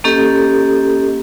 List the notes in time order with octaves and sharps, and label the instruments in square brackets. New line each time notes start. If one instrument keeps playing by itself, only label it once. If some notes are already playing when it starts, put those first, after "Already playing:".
[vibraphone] A#3 C#4 G4 A4 D#5